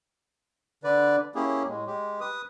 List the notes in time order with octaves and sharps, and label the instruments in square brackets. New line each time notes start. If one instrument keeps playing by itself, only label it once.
[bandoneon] D3 B4 D5
A#3 C#4 E4 G4 G#4
A2 G#3
G#3 G4
B4 D#6